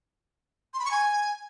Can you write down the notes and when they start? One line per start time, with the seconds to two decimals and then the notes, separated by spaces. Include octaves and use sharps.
0.74 C6
0.79 B5
0.85 C#6
0.91 G#5